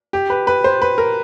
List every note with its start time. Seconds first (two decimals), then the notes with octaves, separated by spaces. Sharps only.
0.13 G4
0.30 B4
0.47 B4
0.64 C5
0.82 B4
0.98 A#4